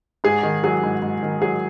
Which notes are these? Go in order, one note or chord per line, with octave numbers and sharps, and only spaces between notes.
G#2 G#4
D#3
F#3 G#4
G#2
G#2
D#3
F#3 G#4